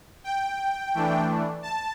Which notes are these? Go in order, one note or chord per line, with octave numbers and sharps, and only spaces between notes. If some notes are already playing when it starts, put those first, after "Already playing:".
G5
E3 A3 D4
A5